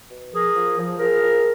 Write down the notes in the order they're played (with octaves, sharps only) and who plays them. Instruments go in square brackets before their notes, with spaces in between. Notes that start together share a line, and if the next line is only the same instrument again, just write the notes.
[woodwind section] B2
F3 G#4 A#4
F3
F3
F3 G#4 A#4
F3